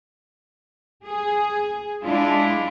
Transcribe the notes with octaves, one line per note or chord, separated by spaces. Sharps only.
G#4
G#3 D4 E4 F4